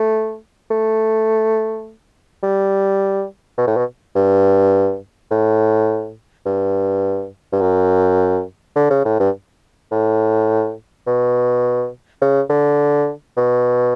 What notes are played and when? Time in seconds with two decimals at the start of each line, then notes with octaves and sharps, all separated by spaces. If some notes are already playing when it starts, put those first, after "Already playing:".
Already playing: A3
0.71 A3
2.43 G3
3.58 B2
3.67 A2
3.77 B2
4.15 G2
5.31 A2
6.46 G2
7.52 G2
7.61 F#2
8.76 D3
8.90 C#3
9.05 A2
9.20 G2
9.91 A2
11.07 B2
12.21 C#3
12.50 D3
13.37 B2